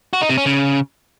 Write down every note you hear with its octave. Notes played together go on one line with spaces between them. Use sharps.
F#4
D#4
C3
C#4
C#3